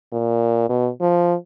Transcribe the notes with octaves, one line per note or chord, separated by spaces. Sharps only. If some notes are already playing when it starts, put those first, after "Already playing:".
A#2
B2
F3